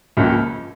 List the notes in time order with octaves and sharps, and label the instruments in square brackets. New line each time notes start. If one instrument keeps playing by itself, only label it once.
[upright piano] C#2 C#3 F3 A#3